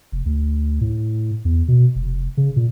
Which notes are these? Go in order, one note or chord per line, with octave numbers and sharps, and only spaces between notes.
F1
D2
A2
E2
B2
F1
C#3
A#2